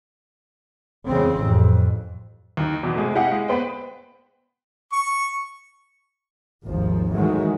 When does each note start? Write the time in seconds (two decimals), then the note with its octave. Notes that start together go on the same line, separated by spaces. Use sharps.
1.08 E2 C#3 G#3 C4
1.40 A1 F2
2.57 D#2 D#4
2.83 E2 B2
2.96 C3 G#3 A3
3.15 E4 G4 D#5 F5 F#5 G#5
3.32 G#3
3.48 B3 B4 C5 G5
4.92 C#6
6.65 G#1 D#2 F3
7.13 D#3 E3 F#3 G#3 A3